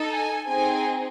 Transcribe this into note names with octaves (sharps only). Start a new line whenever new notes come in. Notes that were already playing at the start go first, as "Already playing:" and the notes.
Already playing: D#4 A4
G#5
C4 D#4 G#4 G#5